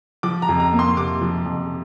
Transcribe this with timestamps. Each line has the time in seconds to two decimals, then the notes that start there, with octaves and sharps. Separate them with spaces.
0.23 F3 D6
0.42 A#5
0.49 F2
0.60 A#5
0.73 A#3
0.79 C6
0.97 C3 D6
1.21 F3
1.46 F2